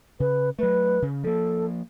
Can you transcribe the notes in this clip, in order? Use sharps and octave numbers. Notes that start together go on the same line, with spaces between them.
C#3 B4
F#3 A3 B4
C#3
F3 A#3 A4